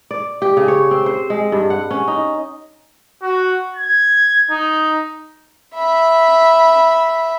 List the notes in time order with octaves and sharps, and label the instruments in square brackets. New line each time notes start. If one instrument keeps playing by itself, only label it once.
[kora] D5
G4
C#3
C#5
C4
C5
G#3
G2
F#5
C#4
D#4
[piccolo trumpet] F#4
G#6
D#4
[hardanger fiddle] E5 B5